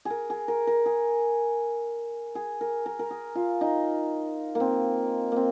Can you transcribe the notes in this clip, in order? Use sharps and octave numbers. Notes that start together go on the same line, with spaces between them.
G#4 A#4
G#4
A#4
A#4
G#4
G#4
A#4
A#4
A#4
G#4
F4
D#4
A#3 C4
A#3 C4